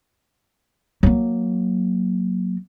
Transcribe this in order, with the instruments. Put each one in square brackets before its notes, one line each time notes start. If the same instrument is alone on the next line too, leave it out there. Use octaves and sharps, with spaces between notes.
[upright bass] F#3 A#3